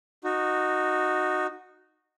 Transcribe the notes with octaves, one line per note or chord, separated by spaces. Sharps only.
D#4 F#4